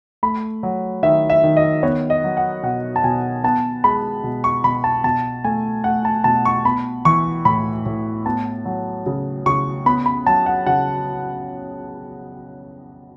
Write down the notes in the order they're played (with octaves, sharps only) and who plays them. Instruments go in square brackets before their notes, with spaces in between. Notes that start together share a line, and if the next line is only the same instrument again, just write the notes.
[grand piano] A3 B5
F#3
D#3 E5
E5
D#3
D#5
B3 C#5
D#5
F#3
F#5
B2 F#5
A5
B2 G#5
B3 A5
G#3 B5
B2
C#6
B2 B5
A5
B2 A5
A3 G#5
A3 F#5
A5
B2 A5
C#6
B3 B5
E3 C#6
A2 B5
A2
B3 A5
F#3
C#3
C#3 C#6
B3 B5
B5
F#3 A5
F#5
C#3 F#5